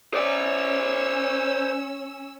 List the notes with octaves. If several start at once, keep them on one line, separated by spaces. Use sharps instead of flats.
C#4 C5 D5 E6